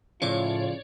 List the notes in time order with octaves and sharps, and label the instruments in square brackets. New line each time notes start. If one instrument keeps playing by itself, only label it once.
[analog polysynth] A2 [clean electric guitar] C#3 F3 [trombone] F4 [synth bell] C#5 D5